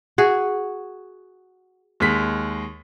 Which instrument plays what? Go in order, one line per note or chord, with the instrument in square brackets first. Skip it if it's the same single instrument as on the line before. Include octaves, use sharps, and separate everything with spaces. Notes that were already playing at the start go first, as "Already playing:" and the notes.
[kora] F#4 G#4
[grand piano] D#2 G#3 B6